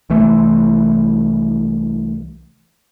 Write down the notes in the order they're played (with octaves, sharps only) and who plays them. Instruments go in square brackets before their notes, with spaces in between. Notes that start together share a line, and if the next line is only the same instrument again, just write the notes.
[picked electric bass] C2 E3 A3